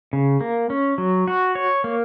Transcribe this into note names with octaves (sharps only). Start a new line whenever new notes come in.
C#3
A#3
C#4
F#3
F#4
C#5
A#3